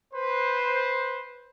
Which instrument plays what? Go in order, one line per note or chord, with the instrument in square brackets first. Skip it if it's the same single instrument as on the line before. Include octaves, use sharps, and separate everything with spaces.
[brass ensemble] B4 C5